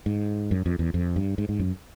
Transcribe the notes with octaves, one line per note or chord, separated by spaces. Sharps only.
G#2
F#2
F2
E2
F2
G2
G#2
G#2
F#2